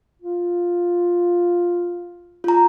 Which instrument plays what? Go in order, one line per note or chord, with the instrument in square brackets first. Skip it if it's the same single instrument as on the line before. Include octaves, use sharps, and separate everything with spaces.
[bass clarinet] F4
[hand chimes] F4 A#5